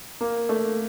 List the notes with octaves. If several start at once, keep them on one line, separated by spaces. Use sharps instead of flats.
A#3
A3